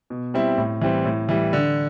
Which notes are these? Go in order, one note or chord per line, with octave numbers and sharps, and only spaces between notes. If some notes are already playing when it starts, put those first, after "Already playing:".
B2
G3 C4 E4
A2
E3 G3 C4
A2
E3 G3
D3